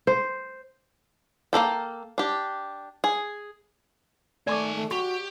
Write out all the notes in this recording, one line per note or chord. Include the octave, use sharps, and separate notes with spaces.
C5
A#3 F#4 A4 G5
D4 G4
G#4
D#3 A3 D5 G#5 C#6 D6
A3
F#4 G4 C#6